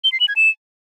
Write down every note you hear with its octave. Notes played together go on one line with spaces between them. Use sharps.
G7
C7
F#7
G#6
E7